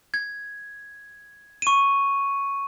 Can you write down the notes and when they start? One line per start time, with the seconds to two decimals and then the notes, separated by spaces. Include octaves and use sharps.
0.14 G#6
1.62 C#6 D#7